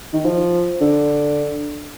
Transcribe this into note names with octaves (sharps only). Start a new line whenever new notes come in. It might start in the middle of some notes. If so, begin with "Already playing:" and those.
D#3
F3
D3